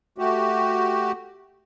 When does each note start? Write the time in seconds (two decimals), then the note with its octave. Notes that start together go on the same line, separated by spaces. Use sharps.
0.18 A3 F#4 G4